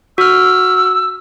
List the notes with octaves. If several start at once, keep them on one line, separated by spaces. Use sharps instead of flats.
F#4 E6 F6